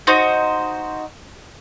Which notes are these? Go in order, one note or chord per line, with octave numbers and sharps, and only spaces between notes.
D#4 F#4 C5